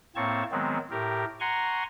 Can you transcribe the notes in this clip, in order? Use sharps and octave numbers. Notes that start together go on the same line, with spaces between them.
A2 A#3 C4 C#5 A5 C#6
D#3 F#3 G#3 B3 C4
A2 G4 A#4
F#5 G#5 A#5 C6 C#6